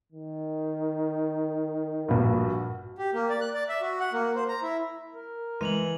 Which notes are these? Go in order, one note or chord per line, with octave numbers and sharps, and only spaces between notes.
D#3
A#1 G2 F#4
G4
A#3
D5
F#6
D5
E5
F#4
F#5
A#3
C5
A#5
E4
A#4
E3 G#3 D#7 F7 F#7